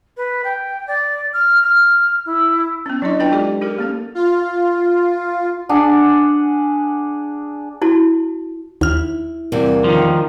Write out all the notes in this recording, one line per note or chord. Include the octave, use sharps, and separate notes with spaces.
B4
G5
D5
F6
F6
E4
B3 C#4
F#3 D4 E4 D#5
D4 F4 B4 G5 A5
G#3 F4 G4 A4 D5
D#4 G4 G#4 A#4
A#3 C#4 A4
F4
D4 G#4 F#5
E4 F#4 A5
D#2 E4 F6
E2 C3 G3 A#3
D#3 F3